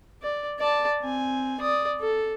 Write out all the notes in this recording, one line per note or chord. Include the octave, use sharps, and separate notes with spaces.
D5
D5 A5
C4 G#5
D5 D#6
A4